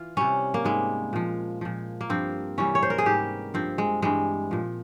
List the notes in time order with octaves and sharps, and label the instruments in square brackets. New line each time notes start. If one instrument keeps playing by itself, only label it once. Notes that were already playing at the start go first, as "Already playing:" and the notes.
Already playing: [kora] E3 F4
C3 G3 C#4
A#3
G#2 G3 G#3
A#2 F3
A#2 F3
A#3
G2 F3 C4
C3 E3 G3 C#4
C#5
C5
A#4
G#4
G#2 G3 G4
G2 F3 C4
G#3
G2 E3 G3 G#3
A#2 F3